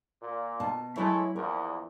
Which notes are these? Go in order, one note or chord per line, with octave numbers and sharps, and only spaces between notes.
A#2
B2 A5
E3 F#3 G#3 A3 E4 C#5
A#1 E2 A#4